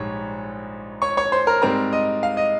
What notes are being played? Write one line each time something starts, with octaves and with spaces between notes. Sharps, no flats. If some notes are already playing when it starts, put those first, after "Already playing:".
Already playing: A#1 G#2 G3 C#5
C#5 C#6
C#5 C#6
C5 C6
A#4 A#5
G#2 G3 C4 A#4 A#5
D#5
F5
D#5